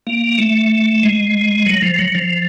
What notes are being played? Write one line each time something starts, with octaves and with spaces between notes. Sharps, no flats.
A#3
A3
G#3
F#3
F3
F#3
F3